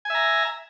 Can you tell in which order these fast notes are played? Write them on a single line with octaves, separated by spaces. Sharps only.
G#5 E5 A#5